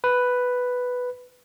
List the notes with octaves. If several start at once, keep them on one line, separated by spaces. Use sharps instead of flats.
B4